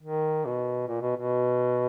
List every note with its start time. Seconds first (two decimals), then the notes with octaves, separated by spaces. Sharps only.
0.02 D#3
0.45 B2
0.88 A#2
1.02 B2
1.17 B2